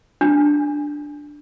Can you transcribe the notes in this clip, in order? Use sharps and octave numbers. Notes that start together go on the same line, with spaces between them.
D4